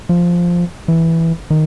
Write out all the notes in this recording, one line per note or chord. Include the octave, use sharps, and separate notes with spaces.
F3
E3
D#3